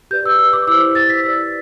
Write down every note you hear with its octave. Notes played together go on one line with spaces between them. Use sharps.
G4 B4 D5 G6
E6
E6
D6
E4 G4 C5 E6
A6
B6
E4 G4 B4 D5 E6